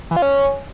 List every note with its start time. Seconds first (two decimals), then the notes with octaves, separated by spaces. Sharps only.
0.11 E3
0.17 F4
0.22 C#4